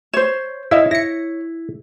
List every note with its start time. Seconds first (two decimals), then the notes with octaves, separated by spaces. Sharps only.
0.14 C5 C#5 E7
0.71 E4 C#5 D#5 F5 E6
0.91 E4 A#6 C#7